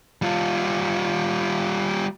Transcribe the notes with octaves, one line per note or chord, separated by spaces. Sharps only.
G3 F4